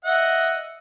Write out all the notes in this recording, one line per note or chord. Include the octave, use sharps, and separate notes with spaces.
D#5 E5 F#5